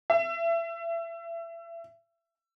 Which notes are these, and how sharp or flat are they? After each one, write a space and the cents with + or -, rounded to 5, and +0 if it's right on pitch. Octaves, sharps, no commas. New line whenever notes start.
E5 +30